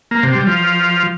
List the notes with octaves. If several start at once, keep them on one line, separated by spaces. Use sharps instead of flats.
A#3
C3
G3
F3